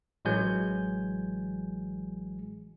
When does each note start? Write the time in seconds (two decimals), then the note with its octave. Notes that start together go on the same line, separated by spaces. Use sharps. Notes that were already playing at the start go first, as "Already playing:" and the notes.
0.25 A1 E3 F#3 G#3 G#5 G6